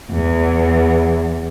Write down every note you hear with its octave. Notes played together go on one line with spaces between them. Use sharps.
E2